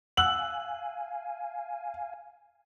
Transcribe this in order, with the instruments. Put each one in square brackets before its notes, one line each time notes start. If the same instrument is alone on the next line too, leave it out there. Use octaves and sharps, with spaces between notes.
[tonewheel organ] F5 G#5 [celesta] F#5 E6 F#6 [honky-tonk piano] F#7